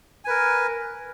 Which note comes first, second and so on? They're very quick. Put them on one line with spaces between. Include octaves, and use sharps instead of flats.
G#5 B4 A#4